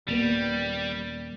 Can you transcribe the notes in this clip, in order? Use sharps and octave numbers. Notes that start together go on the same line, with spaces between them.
D#1 G3 A#3 B3